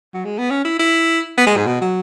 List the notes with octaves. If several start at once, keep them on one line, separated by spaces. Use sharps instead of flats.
F#3
G#3
B3
C#4
E4
E4
B3
G#3
G#2
B2
F#3